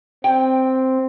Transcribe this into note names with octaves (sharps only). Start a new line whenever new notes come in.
C4 G5